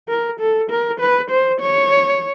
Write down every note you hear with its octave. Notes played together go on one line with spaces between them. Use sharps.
A#4
A4
A#4
B4
C5
C#5